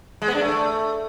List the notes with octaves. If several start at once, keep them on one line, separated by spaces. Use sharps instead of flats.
G#3
B3
D4
A3